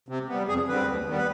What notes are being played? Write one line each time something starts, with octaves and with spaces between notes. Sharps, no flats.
C3
G3 B3
F2 G#4
D3 G3 C4 B4
D#2
D#3 G3 B3
B4